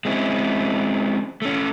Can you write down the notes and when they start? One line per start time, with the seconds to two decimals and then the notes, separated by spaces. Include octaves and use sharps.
0.05 G#3 C4 C#4 E4
1.42 A3 C#4